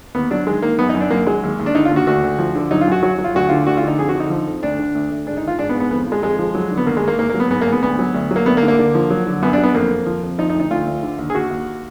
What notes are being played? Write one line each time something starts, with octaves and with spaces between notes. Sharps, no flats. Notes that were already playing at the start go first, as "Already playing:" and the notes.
D#2 B3
F#3 D4
D#3 G#3
D#3 A#3
F#2 B3
D#4
F#2
D4
F#2 A#3
F#3 G#3
D#2
D#2
D4
D3 D#4
F4
D#2
F#4
D2 F#4
D2
F3
D3
F#3 D#4
F4
F#2 F#4
F#3 F#4
F#3
F4
D2 F#4
D3 F4
D2 F#4
F4
D3 D#4
F2 G#4
F#4
D3
D#4
F3
F2
D2 D4
D3
D2
D2
G#2 D4
D#4
D#3 F4
G#2 D4
B3
G#2
B3
F2 B3
F3
G#3
F2 G#3
F3
F#3
D3
B3
D#2 A#3
G#3
D#2 A#3
G#2 A#3
A#3
F#3
B3
G#2 B3
A#3
G#2
B3
D2 B3
F#3
D2
F#3
A#3
D2 B3
A#3
D3
A#3
D3
F3
F#3
D3
F#2 B3
D4
F#3
B3
F2 A#3
F2
F3
F2
F3 D#4
D#4
D2
D#4
D2 F4
D2
D3
D#2
G#4
D#2 F#4
D#2